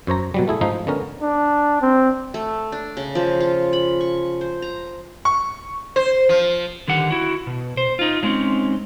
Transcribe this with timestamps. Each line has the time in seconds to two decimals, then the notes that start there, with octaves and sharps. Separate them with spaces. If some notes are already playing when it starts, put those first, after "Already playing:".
0.07 F#2 C5 C#5 A#5
0.34 B2 F#3 G3
0.48 A3 E4 G#4
0.61 G#2 F3 D#4
0.87 D3 B3 C#4 A#4
1.22 D4
1.82 C4
2.34 A3
2.72 D4
2.97 C#3
3.15 F3
3.40 F4
3.73 B5
4.01 C#6
4.41 C5
4.62 A#5
5.25 C#6
5.96 C5
6.29 F3
6.88 D3 D#3 G4 F#5
7.11 E4 F#4
7.47 B2
7.77 C5
7.99 D#4 F4
8.23 F#3 G#3 C4 C#4 D#4